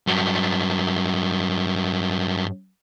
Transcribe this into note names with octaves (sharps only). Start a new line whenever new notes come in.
G2 F#3